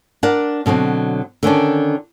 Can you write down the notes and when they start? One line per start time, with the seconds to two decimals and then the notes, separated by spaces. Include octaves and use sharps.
0.23 D4 A#4 D5 F#5
0.66 B2 D3 F#3 C4
1.43 D3 D#3 C#4 D4